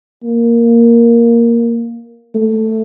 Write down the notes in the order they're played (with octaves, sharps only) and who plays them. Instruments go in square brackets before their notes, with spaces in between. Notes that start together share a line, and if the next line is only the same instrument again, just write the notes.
[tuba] A#3
A3